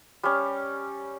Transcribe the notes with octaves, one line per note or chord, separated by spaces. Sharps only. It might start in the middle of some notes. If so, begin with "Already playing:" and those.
G3 C#4